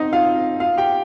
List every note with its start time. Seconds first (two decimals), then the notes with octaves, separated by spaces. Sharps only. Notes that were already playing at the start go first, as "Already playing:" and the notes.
Already playing: C4 D#4 D#5
0.13 F4 F5
0.60 F4 F5
0.77 G4 G5